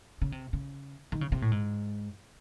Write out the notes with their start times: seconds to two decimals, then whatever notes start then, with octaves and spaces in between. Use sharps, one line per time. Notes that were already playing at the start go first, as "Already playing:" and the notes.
0.22 C#3
0.32 C3
0.53 C#3
1.12 D#3
1.21 C#3
1.32 C3
1.42 A2
1.52 G#2